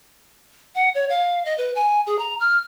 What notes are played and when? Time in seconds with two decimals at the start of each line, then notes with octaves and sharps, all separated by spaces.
0.75 F#5
0.95 C#5
1.09 F5
1.45 D#5
1.58 B4
1.75 G#5
2.06 G#4
2.19 A#5
2.40 F6